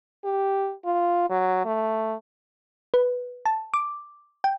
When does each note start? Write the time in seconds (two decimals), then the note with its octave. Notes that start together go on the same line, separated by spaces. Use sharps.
0.24 G4
0.85 F4
1.30 F#3
1.65 A3
2.94 B4
3.46 A5
3.74 D6
4.44 G5